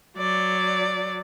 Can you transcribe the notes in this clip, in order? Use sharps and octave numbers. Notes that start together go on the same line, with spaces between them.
F#3 D5